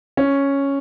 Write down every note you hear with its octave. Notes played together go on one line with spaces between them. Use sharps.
C#4